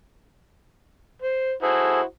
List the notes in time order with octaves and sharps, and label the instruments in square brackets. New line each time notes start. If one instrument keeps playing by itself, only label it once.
[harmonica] C5
[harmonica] E4 F#4 C5 [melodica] G#4 A4